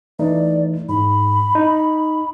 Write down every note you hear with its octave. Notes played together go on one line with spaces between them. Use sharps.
E3 A3 D#4 D5
G#2 B5
D#4